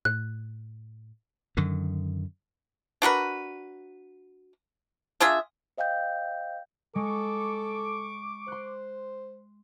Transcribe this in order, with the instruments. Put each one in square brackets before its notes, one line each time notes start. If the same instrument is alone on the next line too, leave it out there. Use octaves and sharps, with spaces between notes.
[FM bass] A2 [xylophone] F#6
[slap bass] F#2 D3 D#3
[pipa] D4 F#4 A#4 B4
D4 F4 G#4 E5
[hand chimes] C5 D#5 F5 G5 G6
[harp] G#3 [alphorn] A4 [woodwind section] C#6 D6
[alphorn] C5 [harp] C6 F#6